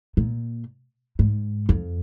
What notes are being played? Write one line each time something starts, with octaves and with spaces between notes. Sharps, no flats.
A#2
G#2
F2